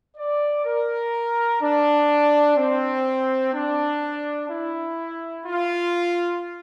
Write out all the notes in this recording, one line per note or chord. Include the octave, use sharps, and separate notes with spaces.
D5
A#4
D4
C4
D4
E4
F4